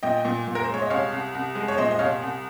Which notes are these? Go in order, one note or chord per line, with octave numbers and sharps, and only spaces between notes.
A#2 D#5 G5
A#2
A#2
A#4
C5
G#3
C#5
D#5
C2 C#5 F5
C2
C2
G#3
C#5
A#2 C5 D#5
D#5
C2 C#5 F5
C2